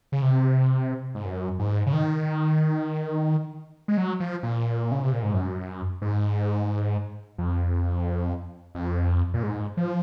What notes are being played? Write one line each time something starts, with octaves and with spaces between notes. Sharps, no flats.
C#3
C3
G#2
F#2
G#2
C#3
D#3
G#3
F#3
F3
A#2
C#3
C3
A#2
G#2
F#2
G#2
F2
F2
A#2
G#2
F3